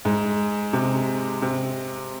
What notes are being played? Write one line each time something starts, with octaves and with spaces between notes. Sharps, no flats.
G#2
C3
C3